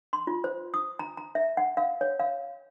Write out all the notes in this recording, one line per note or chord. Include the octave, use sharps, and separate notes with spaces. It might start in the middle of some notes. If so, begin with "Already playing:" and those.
C6
F4
C5
D#6
A#5
A#5
E5
F#5
F5
C#5
F5